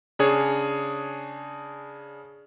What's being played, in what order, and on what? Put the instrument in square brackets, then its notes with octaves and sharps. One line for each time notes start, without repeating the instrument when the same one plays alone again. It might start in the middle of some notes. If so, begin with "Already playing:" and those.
[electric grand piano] C#3 D4 G#4 C#5